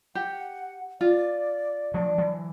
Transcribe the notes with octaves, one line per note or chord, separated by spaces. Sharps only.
G4 F#5
F4 D5
F3 F#3 A3 D4
E3 F#3